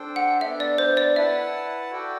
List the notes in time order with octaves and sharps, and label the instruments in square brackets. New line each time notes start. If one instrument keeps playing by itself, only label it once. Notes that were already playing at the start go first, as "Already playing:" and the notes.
Already playing: [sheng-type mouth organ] D4 A4 C5 G5
[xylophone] F#5
[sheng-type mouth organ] A4 [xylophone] E5
[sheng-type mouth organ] B3 D4
[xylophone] D5
C5
D5
[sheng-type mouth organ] E4 B4 F#5 A5 [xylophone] E5
[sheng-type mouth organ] F#4 A4 D5 G5